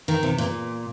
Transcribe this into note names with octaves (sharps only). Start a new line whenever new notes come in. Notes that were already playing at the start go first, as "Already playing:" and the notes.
D#3
C3
A#2